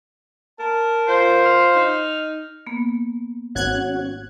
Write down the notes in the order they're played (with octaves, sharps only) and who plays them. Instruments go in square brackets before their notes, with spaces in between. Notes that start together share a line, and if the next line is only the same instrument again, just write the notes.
[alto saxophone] A#4 [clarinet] A5
[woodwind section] F4 C5
[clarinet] F6
[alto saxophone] D#4
[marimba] A#3 B3
[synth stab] G#1 F#6 G#6 [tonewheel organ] C#4 F#4